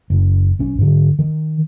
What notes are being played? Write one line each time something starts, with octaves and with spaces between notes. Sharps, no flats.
F#1
B1 C#4
G#2 D3
D#3